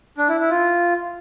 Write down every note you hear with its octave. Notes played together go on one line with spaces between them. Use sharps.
D4
E4
E4
F4